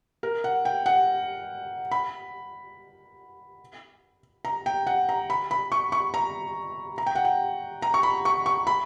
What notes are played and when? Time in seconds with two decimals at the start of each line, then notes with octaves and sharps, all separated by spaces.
0.23 A#4
0.44 F#5
0.65 G5
0.86 F#5
1.91 B5
4.45 A#5
4.66 G5
4.87 F#5
5.09 A#5
5.30 B5
5.51 B5
5.72 C#6
5.92 C#6
6.14 A#5
6.98 A#5
7.06 G5
7.15 F#5
7.25 G5
7.82 A#5
7.94 C#6
8.03 B5
8.25 C#6
8.46 C#6
8.67 B5